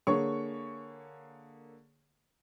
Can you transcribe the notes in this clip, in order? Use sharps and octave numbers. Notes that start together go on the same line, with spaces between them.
D3 A#3 G#4 C#5 C#6